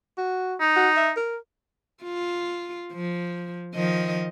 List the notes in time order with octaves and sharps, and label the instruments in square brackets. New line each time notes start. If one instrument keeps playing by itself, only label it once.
[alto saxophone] F#4
[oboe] D#4
[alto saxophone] F#4
E5
A#4
[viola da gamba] F4
F3
D#3 F3 D#5